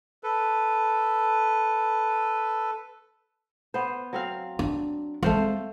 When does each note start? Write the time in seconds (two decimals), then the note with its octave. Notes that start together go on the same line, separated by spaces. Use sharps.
0.23 A4 B4
3.74 B3 C5
4.13 F#3 C4 F5
4.59 D4
5.23 G#3 A3 C4 C5 F5